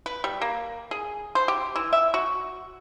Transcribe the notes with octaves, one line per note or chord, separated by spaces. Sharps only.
B4
G3
A#3
G#4
C5
G4
E3
E5
F#4